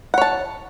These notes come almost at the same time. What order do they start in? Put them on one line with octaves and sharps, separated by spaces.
F#5 C#5 A5